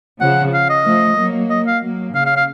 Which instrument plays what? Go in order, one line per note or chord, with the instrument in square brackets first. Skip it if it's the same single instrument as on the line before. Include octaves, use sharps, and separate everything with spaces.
[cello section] C#3 F3 [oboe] F#5
[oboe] F5
D#5
[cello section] F3 A3
F#3 A#3
[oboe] D#5
F5
[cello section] F#3 A#3
[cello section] C#3 [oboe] F5
[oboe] F5
F5